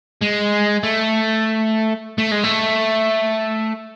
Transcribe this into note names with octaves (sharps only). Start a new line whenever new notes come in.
G#3
A3
A3
G#3
A3